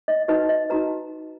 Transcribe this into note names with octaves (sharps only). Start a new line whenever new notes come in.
D#5
D#4 F#4 B4 D#5
D#5
D#4 F#4 B4 A#5